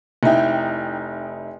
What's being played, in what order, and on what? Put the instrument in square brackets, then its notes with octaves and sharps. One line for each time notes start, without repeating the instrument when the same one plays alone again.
[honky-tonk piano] F1 D#4 E4 G5